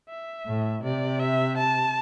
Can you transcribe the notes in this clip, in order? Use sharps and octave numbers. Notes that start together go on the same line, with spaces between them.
E5
A2
C3 D5
E5
A5